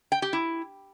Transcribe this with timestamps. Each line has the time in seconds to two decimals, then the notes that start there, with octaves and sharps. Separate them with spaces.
0.12 G5
0.22 G4
0.33 E4